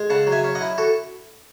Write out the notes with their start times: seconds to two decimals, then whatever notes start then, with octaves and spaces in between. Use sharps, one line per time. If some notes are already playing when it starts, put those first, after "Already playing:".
Already playing: G#3
0.10 C#3 F#5 A5
0.27 F#3
0.32 E5 G#5
0.44 C#4
0.55 D#5 F#5
0.61 E4
0.78 F#4 A4